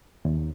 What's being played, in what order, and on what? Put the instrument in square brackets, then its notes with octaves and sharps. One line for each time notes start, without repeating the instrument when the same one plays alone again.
[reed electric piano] D#2